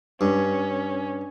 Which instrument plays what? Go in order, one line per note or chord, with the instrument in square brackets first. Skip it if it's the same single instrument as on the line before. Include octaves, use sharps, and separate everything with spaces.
[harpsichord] G2 [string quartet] C#4 [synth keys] D4